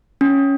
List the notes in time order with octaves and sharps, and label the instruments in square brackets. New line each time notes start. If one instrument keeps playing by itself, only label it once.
[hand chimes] C#4